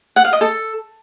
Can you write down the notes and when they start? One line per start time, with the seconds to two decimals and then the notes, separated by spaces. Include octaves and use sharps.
0.16 F#5
0.24 F5
0.33 D#5
0.41 A4